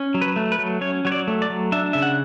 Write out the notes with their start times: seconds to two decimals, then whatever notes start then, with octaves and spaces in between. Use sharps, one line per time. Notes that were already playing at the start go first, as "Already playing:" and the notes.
Already playing: C#4
0.14 F#3
0.22 B4
0.36 A3
0.52 B4
0.59 F#3
0.81 C#4 C#5
1.05 F#3 C#5
1.12 D5
1.28 A3
1.42 D5
1.50 F#3
1.72 D4 E5
1.93 C#3 E5
2.02 F#5